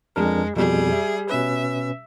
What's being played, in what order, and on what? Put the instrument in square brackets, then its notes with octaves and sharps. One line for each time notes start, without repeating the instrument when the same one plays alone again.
[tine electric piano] F2 D4 A#4 [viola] G#3
[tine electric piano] F2 B2 [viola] G3 G#4
[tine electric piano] E5
[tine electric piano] B2 C#4 B4 [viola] E5